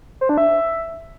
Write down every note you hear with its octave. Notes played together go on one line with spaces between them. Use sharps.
C5
D4
E5